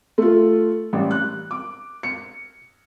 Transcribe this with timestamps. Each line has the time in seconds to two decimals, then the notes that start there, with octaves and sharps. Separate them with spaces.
0.18 A3 F4
0.93 A1 G3
1.11 F#6
1.51 D6
2.03 C#7